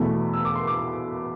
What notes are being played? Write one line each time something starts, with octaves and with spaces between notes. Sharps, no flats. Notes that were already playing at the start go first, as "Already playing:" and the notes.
Already playing: E2 B2 A3 E4
E6
D6
C6
D6